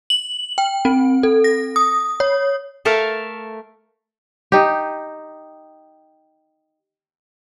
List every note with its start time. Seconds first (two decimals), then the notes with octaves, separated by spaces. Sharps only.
0.10 F#7
0.58 G5
0.85 C4
1.23 A4
1.44 A#6
1.76 D#6
2.20 C#5
2.85 A3 A4 A#4 E5 F5
4.52 D#4 G4